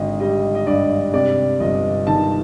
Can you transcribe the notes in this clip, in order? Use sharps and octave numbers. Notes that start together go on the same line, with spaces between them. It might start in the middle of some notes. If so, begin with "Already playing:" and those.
Already playing: G#1 D3 D#5
G3 D#5
D#5
G2 D5
C3 D5
G1 D#5
D#3 A5